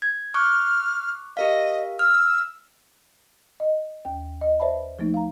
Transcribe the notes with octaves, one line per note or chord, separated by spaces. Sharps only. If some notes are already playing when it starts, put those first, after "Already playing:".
G#6
C#6 D6 F6 F#6
G4 A#4 D#5 F5
E6 F6
D#5
D#2 G5
D#5
B4 C5 D5 E5 A5 B5
F3 A3 A#3 D#4
F5 A#5